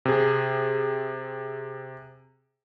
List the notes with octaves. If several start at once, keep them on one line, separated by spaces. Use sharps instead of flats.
C3 G#4